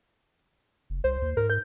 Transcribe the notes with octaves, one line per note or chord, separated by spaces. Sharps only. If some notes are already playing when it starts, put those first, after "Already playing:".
F1
C2 C5
D#2
G#2 A#4
G6